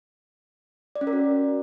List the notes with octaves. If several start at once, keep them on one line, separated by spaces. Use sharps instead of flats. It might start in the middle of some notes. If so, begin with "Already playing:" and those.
D5
C#4
A#4
F#4